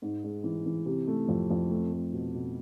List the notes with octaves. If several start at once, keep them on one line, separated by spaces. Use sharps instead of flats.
G#2
G#3
E3
E3
C3
A3
F2
F2
A3
A3
B2
B2